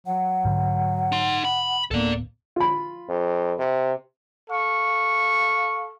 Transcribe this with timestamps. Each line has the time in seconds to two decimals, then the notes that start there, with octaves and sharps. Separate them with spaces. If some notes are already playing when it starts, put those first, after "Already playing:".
0.06 F#3 F#5
0.45 G#2 D3
1.12 D#4 C6
1.45 B5
1.91 D1 A#3 B3 A4 D5
2.56 F4 B5
3.09 F2
3.59 C3
4.50 A4 F5 C#6